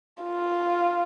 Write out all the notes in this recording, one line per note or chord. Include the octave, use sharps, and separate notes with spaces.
F4